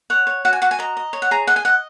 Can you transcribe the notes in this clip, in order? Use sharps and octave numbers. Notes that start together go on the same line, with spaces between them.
C#5 F#5
C#5
F#4 F#5
G#5
F#4 F#5
G#5
D#5 A#5
D#5
C#5
F#5
G#4 A#5
D#5 F#5
G#5
D#5 F#5